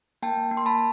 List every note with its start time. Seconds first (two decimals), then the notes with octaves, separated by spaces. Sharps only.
0.22 A#3 G5 A5
0.51 A#3
0.57 C6
0.66 A5 B5